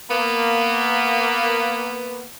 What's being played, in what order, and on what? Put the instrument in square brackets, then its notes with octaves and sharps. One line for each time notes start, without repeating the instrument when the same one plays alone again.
[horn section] A#3 B3